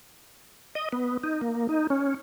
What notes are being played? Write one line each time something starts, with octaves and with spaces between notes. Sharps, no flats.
D#5
B3
D#4
A#3
D#4
C#4